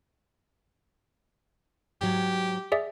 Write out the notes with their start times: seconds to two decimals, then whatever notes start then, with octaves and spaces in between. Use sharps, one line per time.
2.01 G#2 F#3 G4
2.72 G#4 D5 E5